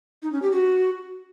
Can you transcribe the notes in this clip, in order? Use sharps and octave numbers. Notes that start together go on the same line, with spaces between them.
D#4
C#4
G4
F#4